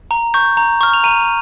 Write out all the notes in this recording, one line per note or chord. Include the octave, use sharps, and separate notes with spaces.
A#5
C#6 G6
A#5
C#6 F6
F7
A#5 D#7